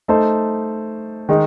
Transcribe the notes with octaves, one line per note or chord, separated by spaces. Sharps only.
A3 D#4 A4 C5
D#3 G#3 D#4